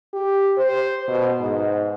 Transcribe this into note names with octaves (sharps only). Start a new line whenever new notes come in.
G4
C5
B2
G#2